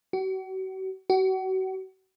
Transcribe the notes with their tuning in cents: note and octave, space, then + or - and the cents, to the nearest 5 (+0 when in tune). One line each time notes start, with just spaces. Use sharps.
F#4 +40
F#4 +35